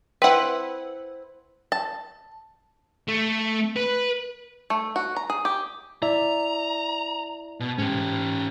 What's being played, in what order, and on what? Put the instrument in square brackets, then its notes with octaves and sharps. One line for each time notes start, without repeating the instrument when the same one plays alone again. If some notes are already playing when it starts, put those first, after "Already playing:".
[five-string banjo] C4 E4 [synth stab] B4 F#5
[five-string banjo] A5
[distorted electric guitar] A3
B4
[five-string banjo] A3
F#4
A#5
G#4
G4
[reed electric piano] E4 D5 E5 [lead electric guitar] A#5
[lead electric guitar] B2
[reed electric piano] G#2 [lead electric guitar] C#4 G4